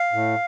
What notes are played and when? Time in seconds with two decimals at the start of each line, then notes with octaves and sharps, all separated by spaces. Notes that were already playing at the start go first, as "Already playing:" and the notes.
Already playing: F5
0.13 A2